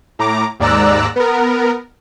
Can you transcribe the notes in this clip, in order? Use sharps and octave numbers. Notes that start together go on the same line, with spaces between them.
A2 A#5 D6
D#2 G#2 D5 A#5 E6 F#6
B3 A#4